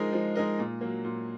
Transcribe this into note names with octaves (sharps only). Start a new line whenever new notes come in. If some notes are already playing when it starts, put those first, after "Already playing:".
Already playing: F3 G#3 D#4 A#4 D#5
F3
G#3 D#4 A#4 D#5
A#2
F#3 A#3
A#2